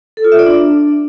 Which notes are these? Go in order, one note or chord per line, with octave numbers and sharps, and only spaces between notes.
A4
F4
E5
D5
D4